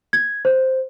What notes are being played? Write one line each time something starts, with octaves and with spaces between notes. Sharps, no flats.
G#6
C5